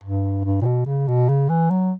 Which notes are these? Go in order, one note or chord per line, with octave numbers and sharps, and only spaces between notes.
G2
G2
A#2
B2
C#3
B2
C#3
E3
F#3